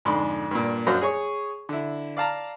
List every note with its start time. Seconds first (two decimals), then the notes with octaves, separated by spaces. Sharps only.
0.05 F2 G#2 D3 D5 B5 C6
0.51 G2 A#2
0.87 F#2 F#3 D4 C5 F5 D#6
1.01 G#4 C#5 C#6
1.69 D3 E4
2.17 D5 F5 A5 A#5